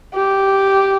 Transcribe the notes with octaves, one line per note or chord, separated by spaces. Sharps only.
G4